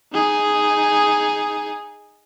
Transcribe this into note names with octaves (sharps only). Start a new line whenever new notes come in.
D#4 G#4